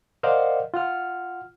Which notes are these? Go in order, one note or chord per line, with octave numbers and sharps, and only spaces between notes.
A#4 C5 D5 D#5 F5 F#5
F4 F#5 F6